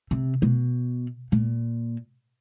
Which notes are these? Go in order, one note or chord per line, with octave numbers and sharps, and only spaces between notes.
C3
B2
A#2